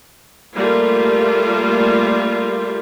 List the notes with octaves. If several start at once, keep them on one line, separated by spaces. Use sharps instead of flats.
G3 A3 A#3 F4